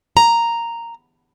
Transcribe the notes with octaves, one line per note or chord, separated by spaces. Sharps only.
A#5